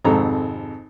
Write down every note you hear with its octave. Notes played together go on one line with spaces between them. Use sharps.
G#1 F2 C3 A4 A#5